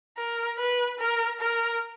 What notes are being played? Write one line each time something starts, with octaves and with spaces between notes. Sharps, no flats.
A#4
B4
A#4
A#4